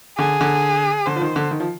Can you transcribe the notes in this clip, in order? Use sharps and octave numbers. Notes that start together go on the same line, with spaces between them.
D3 G#4
D3
D3 C5
F3
D#3
D3
D#3
F3